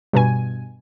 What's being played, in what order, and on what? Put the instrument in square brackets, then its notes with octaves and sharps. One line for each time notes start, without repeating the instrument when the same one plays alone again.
[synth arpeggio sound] G2 B2 G#5